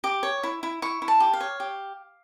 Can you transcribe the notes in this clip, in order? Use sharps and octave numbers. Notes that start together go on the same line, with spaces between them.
G4 D6
C#5
E4
E4
E4 C#6
E4
A5
G4
F5
C#5
G4